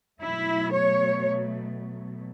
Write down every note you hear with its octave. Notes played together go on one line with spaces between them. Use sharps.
B2 F#3 A3 E4
C#5